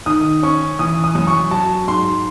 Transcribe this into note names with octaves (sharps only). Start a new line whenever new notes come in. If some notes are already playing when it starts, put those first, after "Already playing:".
D#3 D#6
C#4 C#6
E3 D#6
D#6
F#2
C#6
F#3 A5
G#2 C6